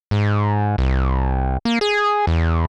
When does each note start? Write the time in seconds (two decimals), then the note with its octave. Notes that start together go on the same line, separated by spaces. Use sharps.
0.11 G#2
0.78 C2
1.65 A#3
1.81 G#4
2.27 E2